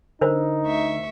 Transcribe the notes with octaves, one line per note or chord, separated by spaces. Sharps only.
D3 D#4 A#4 C5
D2 E5 C#6